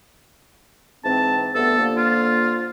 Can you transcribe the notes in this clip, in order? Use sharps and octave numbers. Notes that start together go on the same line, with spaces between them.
G#2 E3 C4 A5
G2 A3 B3 A4
D3 F3 A#3
F4